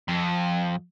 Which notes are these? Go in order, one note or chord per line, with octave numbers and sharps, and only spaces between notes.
F2